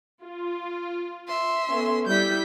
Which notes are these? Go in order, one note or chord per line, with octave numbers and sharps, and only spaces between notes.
F4
E5 C6
B3 C#4 A4
G3 E4 G6 B6